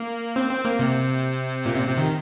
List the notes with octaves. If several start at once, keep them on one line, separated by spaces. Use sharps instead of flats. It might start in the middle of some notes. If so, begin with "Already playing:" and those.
Already playing: A#3
C4
C4
A#3
C3
A#2
C3
C3
D#3